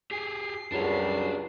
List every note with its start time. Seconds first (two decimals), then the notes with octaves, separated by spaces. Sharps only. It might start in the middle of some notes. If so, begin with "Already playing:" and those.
0.11 G4 G#4 G#5 C7
0.72 C#2 F#2 F#3 G3 D4 C#5